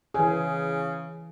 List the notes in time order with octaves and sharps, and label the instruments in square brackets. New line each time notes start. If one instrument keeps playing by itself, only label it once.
[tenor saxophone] C#3 [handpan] E3 G#4